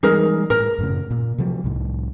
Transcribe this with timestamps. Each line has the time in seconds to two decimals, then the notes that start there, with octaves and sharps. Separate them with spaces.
0.03 E3 G3 G#3 D#4 G#4 A#4
0.50 A2 A#4
0.79 F#2 A2 C#3
1.10 A#2
1.38 C3 F3 F#3
1.64 C2 A2